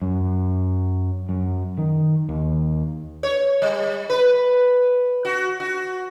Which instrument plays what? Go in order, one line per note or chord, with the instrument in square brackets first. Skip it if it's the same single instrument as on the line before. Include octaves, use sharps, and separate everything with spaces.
[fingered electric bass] F#2
F#2
D#3
D#2
[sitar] C#5
G3
B4
F#4
F#4